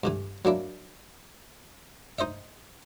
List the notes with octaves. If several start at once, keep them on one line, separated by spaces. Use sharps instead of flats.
G2 D3 E3
F#3 A#3 D4 E4
D#4 C5 D#5 E5